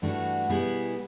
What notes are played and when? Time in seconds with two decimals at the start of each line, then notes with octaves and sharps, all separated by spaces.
0.02 G2 E3 A3 D4 F#4
0.49 B2 G3 B3 E4 G#4